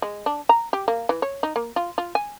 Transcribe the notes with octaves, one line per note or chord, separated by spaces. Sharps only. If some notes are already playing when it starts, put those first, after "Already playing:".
G#3
D4
A#5
G4
A#3
E3
C#5
D#4
A#3
F4
F4
G#5